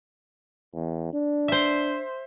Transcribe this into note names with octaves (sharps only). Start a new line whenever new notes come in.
E2
D4
C5 E5